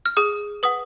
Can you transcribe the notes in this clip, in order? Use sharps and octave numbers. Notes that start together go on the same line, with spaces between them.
F6
G#4 D#6
B4 F#5 D#6